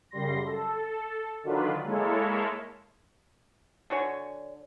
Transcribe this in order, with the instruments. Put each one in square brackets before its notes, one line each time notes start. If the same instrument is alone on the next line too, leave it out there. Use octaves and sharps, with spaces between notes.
[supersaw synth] F#2 C#3 G3 C6 A#6
A4
D3 D#3 F#3 D4 F4 B4
G#3 A#3 E4 A4 C#5
[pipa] D3 F#4 C#5 G#5